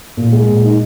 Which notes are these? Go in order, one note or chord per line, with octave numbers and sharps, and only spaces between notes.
A#2
G#3
A#2
D#4